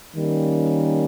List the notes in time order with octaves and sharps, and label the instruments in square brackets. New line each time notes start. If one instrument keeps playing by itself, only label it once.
[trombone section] D#3 G3 A#3 C#4